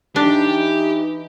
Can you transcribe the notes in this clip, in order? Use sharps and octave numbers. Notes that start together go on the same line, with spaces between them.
E3 D4 D#4 G4